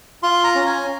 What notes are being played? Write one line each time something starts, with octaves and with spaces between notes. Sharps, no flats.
F4 C6
A#5
C#4
G#5